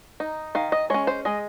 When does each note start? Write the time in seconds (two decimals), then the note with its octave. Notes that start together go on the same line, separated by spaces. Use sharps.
0.20 D#4
0.55 D#3 F5
0.72 D#5
0.90 G#3 C#4 C#5
1.07 C5
1.25 G#3 D#5